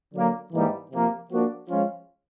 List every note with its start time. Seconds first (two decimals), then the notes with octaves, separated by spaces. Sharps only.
0.14 D3 F#3 A#3
0.53 G#2 E3 G3 A#3 D#4
0.92 C3 F3 A#3
1.30 F3 A#3 D4 F#4
1.69 F3 G#3 C#4 F4